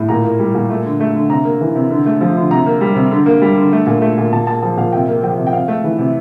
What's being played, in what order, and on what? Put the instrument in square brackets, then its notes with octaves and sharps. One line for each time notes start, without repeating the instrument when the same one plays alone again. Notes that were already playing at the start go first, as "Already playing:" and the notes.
Already playing: [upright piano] A2
A#2 A#5
A#3
G3
A#2
A3
D3
A3
D3
C3 A#5
A#3
E3
C3
D3
A3
F3
D3
C3 A#5
A#3
G3
C3
D3
A#3
G3
D3
A3
A#2
A3
A#2
A#2 A5
A#3 A5
F3 A5
A#2 F5
C3 G5
A#3
F3 G5
C3
G5
C3 F5
A3
E3
C3